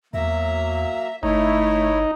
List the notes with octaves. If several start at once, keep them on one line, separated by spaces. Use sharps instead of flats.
E2 F#3 A#3 E5 A#5
G1 A3 D#4 E4 C#5